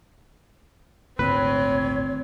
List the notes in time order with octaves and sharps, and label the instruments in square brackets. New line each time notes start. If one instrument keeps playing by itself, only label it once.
[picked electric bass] G#1 D2 A#2 [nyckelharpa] C4 [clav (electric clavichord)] B4 [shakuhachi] C#5